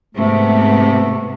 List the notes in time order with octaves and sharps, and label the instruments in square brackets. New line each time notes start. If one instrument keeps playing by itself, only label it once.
[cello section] G#2 C3 B3 [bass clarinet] A3